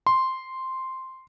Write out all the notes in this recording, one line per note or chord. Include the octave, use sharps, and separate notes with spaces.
C6